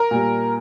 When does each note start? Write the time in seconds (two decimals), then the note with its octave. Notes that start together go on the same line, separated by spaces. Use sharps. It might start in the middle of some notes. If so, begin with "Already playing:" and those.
Already playing: A#4
0.11 A#2 G3